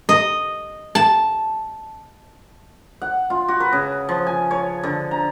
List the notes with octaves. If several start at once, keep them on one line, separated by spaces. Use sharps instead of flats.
D#5
A5
F#5
F4
F#4
B4
C#3
F3
G#5
C#5
D3
A#5